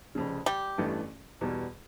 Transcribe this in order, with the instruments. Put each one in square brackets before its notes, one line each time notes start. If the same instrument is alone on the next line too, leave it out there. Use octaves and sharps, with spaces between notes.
[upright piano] F1 F2 C#3
[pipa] G3 G4
[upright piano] A1 G2 E3 A3
E2 B2 G3